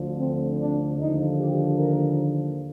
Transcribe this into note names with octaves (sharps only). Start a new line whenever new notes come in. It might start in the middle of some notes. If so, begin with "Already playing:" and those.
Already playing: D2 D3 F3
C4
D4
D#2 D3 F3 D#4
G4
A#4